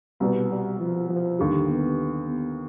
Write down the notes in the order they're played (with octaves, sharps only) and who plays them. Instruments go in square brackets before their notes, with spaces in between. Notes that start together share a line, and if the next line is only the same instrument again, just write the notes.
[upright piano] C2 B2 B3 [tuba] G3
[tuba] G3
F3
F3
[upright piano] D#2 D3 G3
[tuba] B3
B3